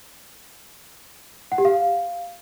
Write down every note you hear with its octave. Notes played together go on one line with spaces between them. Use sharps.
F#5
G4
F5